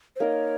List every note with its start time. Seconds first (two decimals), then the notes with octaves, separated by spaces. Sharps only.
0.16 C5
0.20 A#3 D#4 A#4 C#5 D#5